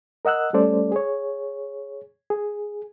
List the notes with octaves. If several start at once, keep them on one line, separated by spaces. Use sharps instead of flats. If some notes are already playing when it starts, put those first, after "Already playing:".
A#4 D#5 F#5 E6 F#6
G3 A3 C#4 A4 C5 D5
G#4 C#5
G#4